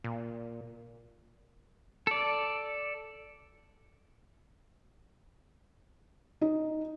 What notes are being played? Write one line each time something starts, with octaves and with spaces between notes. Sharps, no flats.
A#2
A4 D5
D#4